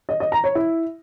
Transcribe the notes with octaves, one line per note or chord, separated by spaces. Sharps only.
D#5
D#5
A#5
C#5
E4